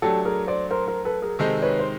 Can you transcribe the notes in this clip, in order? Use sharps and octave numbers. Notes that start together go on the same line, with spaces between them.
F#3 A3 D4 G4 A4
G#4 A#4
C5 D5
A#4 C5
A#4 C5
A4 B4
G#4 A#4
C3 D#3 G#3 C4 D#4 G4 A4
B4 C#5
C5